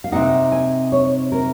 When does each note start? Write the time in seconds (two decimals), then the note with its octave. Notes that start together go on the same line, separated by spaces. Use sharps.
0.04 F5
0.12 C3 F3 C4 D#4 F#5
0.52 G#5
0.92 C#5
1.32 A#4